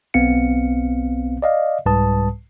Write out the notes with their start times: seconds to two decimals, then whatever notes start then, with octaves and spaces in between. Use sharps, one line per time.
0.14 B1 B3 C4 F5 C#7
1.42 D5 D#5 F5
1.86 C2 G#2 G3 B4 A5 D#6